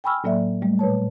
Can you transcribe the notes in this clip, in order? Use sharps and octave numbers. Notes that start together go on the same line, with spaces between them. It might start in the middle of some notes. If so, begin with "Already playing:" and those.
G5 G#5 B5 C#6 E6 F6
A2 F#3 A#3 D5 E5
G3 A3
A#2 B4 C#5 A5